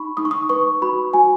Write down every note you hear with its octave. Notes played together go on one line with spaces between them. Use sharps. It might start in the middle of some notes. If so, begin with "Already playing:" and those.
Already playing: D#4 B5 C#6
D#4 D#6
C#6
D#6
B4 C#6
F#4 B5
F#4 G#5